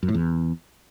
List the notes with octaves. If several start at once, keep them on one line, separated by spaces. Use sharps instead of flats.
F#2
A2
E2